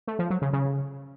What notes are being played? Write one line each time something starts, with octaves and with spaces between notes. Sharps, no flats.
A3
F3
F#3
C#3
C#3